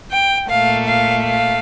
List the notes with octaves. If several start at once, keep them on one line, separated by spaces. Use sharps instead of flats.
G5
A#2 A3 F5
F5
F5